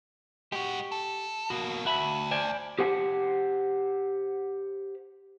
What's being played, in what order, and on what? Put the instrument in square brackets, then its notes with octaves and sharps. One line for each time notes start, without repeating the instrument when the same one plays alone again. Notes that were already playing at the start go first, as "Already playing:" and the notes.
[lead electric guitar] G#3 F#4 [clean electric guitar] G4
[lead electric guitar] A4
[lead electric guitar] B2 A#3 [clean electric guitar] F#4
[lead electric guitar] D2 [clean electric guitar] F#4 E5 B5
[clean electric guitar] C5 D5 G#5
[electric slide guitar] G4 C5 F#5